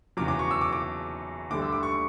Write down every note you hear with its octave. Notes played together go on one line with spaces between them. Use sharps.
E2 C#3 F#3 D6
D6
C#6
E6
D6
D6
D2 D3 G3 D6
E6
D6
C#6